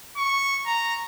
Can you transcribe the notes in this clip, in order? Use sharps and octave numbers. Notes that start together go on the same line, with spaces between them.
C#6
A#5